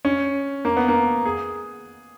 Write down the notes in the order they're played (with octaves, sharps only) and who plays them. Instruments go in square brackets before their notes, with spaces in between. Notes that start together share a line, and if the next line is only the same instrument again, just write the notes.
[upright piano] C#4
A#3
B3
A#3
G#4